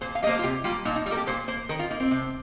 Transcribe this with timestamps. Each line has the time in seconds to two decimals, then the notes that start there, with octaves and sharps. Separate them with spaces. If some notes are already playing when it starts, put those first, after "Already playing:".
0.01 A#2 C5
0.15 F5
0.23 G3 D#5
0.27 A#3 C5
0.39 F4
0.43 C3 G4
0.64 G3 A#3 F4
0.85 A#2 D#4
0.96 D#4
1.06 G3 F4
1.11 A#3 A#4
1.17 G4
1.27 A#2 C5
1.48 A#3 C5
1.69 D#3 A#4
1.79 F4
1.90 A#3 D#4
2.00 C4
2.11 C3